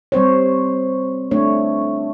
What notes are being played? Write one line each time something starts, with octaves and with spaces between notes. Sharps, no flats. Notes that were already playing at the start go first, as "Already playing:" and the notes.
G3 C4 C5 C#5
A3 D4 C#5